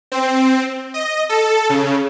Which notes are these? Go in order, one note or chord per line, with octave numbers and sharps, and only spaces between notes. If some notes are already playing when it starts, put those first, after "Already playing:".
C4
D#5
A4
C#3